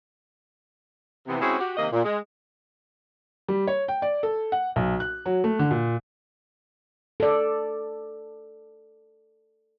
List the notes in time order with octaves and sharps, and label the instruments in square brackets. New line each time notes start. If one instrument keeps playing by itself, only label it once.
[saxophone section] C3 E3 B3
G#3 C4 C#4 E4 F#4 G#4
F#4 G4
C3 D#3 A#3 D#5
A#2
G#3
[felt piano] G3
C#5
G5
D5
A4
F#5
B1
F#6
F#3
A3
D3
A#2
[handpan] A4 D5